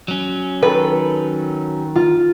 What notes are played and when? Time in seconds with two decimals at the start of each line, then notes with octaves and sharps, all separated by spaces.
0.08 F#3 C#4
0.63 D#3 A4 B4 B5
1.96 F4